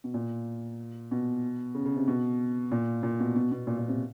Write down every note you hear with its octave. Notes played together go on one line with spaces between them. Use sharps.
B2
A#2
B2
C#3
C#3
C3
B2
A#2
A#2
B2
B2
B2
A#2
A#2
C3